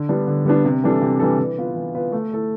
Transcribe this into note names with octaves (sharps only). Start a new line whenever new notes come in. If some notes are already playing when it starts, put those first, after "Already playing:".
Already playing: D3
G3 B3 D4
D3
G3 B3 D4
C3
E3 G3 D4 A4
C3
E3 G3 D4 A4
E3
B3 F4 B4
E3
B3 F4 B4
A3
E4 A4